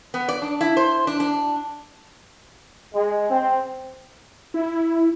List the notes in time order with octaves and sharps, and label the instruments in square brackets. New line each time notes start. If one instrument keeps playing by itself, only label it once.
[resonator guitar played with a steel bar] B3
D5
D4
E4
C5
D4
D4
[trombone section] G#3
C4
[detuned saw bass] E4